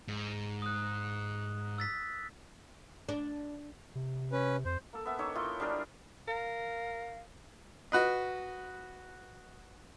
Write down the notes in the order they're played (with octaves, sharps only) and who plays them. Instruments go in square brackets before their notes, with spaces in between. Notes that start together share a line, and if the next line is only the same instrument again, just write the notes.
[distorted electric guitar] G#2
[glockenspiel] D#6 F#6
E6 A6 B6
[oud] D4
[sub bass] C3
[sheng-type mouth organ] C#4 B4
[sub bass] F2 [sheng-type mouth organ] C5
[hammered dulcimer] A#3 A4
B3 E5
D#3 D#4 C#5 D6
E4 F4 D#5 G5
G3 D4 G#4 A#4
[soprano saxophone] A#4 [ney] F5
[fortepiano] F#4 B4 D#5